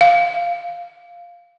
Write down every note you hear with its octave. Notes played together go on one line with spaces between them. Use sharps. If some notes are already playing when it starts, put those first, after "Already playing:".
F5